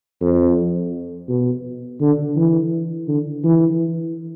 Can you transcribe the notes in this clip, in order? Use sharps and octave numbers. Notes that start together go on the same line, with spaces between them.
F2
B2
D3
E3
D3
E3